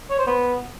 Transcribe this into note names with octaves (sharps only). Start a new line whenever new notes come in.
C#5
C5
B3